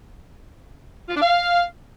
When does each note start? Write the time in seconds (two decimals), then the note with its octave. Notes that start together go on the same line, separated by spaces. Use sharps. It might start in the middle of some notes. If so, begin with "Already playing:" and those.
1.09 F4
1.15 D4
1.22 F5